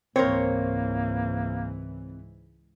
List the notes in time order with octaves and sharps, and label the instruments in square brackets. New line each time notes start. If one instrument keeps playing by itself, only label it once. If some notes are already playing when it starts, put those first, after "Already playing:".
[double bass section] C#2 G#2 E3 [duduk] A#3 [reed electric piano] C4 [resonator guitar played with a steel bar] A#4 C5 C#5